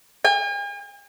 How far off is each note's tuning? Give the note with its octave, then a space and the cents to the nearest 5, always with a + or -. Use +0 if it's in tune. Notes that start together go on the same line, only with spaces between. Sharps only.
G#5 -45